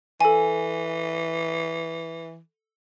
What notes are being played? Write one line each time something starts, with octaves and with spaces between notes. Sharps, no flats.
E3 A4 G#5